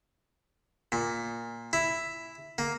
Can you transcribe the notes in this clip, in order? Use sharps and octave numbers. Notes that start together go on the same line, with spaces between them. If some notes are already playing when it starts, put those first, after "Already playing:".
A#2
E4
A#3